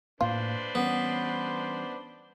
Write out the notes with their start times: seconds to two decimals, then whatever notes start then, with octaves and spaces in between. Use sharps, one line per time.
0.21 A2 A#3 D4 F4 B4 C5
0.75 E3 G3 B3 C#4